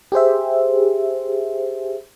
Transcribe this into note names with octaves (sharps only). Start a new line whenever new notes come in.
G4 G#4 C5 E5